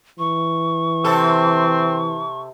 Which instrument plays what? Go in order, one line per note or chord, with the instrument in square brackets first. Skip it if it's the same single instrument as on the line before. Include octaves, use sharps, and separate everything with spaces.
[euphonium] E3 [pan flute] C#6
[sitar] C3 A4 [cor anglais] C4